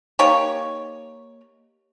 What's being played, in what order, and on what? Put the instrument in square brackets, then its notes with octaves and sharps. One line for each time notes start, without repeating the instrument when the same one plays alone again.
[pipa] A#3 D#4 G4 C#5